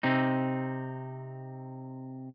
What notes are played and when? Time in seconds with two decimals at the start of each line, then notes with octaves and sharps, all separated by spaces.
0.03 C3 C4 D#4